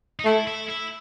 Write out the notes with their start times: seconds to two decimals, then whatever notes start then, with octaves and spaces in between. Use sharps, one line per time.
0.19 D#4
0.25 A3 E4
0.47 E4
0.69 E4